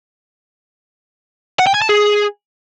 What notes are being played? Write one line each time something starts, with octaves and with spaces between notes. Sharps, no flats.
F#5
G5
G#5
A5
G#4